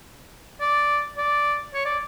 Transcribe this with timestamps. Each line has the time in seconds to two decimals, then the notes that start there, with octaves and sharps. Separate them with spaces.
0.61 D5
1.17 D5
1.74 C#5
1.85 D5